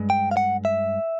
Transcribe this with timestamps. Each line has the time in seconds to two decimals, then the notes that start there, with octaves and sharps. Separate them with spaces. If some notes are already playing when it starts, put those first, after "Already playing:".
Already playing: G2 G#3
0.10 G5
0.31 F5
0.37 F#5
0.65 E5